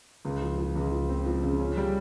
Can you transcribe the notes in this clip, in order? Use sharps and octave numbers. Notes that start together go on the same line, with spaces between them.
C#2
F3
F3
C#2
F3
C4
F3
C#3
C#4
G3